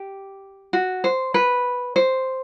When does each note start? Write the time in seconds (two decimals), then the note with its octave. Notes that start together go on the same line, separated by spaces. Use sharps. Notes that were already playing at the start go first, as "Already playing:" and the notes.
Already playing: G4
0.73 F#4
1.04 C5
1.34 B4
1.96 C5